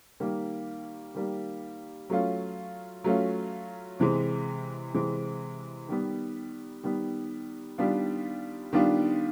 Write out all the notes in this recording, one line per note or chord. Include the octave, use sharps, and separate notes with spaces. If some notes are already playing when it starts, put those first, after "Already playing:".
D#3 G3 A#3
D#3 G3 A#3
F#3 A3 C#4 F4
F#3 A3 C#4 F4
C3 E3 G#3 C4
C3 E3 G#3 C4
D#3 G3 B3
D#3 G3 B3
D#3 G3 B3 D4 F4
D#3 G3 B3 D4 F4